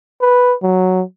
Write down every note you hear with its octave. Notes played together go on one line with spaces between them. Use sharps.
B4
F#3